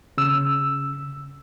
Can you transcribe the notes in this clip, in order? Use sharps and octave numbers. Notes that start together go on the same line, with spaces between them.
C#3 E6